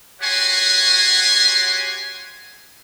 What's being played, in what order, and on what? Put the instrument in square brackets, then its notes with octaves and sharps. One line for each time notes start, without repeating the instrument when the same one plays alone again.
[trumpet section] F#4 G4 C#5 F#5 G#5 C6